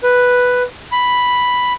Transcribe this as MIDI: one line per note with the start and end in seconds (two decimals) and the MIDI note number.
0.03 0.62 71
0.92 1.73 83